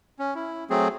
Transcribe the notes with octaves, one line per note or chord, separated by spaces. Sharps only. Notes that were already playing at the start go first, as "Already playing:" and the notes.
C#4
E4
F#3 A3 C4 G#4